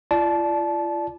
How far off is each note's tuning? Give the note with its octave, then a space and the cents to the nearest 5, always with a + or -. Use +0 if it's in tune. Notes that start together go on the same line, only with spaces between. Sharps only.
F4 -40 D5 +0 A5 -20